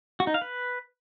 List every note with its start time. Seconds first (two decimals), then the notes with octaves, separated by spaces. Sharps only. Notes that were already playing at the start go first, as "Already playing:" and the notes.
0.20 F#4
0.27 D#4
0.34 F5
0.42 B4